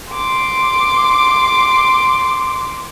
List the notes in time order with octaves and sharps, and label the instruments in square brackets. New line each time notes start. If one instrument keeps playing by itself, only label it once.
[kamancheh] C6 D6